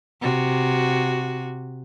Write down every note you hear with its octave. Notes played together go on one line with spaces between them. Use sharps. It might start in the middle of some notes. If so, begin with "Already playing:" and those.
C3 F#4